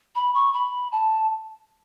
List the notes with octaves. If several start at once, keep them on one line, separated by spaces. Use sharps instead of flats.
B5
C#6
B5
A5